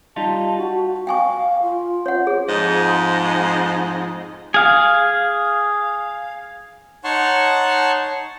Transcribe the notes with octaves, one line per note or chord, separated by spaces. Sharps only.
G3 D#4 F4 A5
F#4
F5 G5 G#5 C#6
F4
C#5 F#5
G#4
F2 G#2 F3 D#5
G#4 F5
D#4 C#5 F#5 A5 C6 C#6